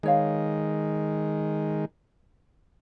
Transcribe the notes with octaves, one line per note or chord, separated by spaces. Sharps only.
D#3 G#3 B4 C#5 F5